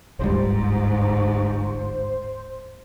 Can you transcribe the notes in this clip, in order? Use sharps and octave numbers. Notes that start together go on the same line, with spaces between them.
D1 G1 D2 G#2 G3 C5